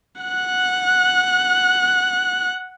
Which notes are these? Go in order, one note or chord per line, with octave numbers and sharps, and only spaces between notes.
F#5 F#6